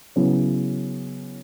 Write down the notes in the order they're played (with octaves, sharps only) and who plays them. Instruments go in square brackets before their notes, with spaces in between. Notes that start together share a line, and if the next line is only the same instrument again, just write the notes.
[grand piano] C#3 F#3 B3 E4